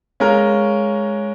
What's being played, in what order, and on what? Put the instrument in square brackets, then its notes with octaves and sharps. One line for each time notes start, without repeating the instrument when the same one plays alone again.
[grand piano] G#3 C#4 F4 A#4